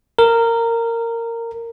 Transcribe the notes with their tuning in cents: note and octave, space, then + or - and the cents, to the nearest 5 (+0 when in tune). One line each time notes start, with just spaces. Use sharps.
A#4 -15